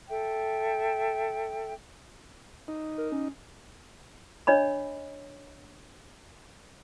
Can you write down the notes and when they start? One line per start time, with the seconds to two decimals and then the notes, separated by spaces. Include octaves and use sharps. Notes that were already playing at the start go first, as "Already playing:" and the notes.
0.09 A4 E5 G5
2.68 D#4
2.98 A#4
3.12 C#4
4.47 D4 C#5 D#5 B5